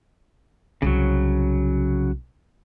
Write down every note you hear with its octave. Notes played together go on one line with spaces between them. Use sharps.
C2 C#3 F#3 C4